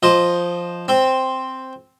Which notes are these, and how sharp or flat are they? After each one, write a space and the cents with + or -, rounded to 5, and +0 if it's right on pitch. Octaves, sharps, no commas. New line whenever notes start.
F3 +0 C5 +5 D#5 -5
C4 +0 C5 +0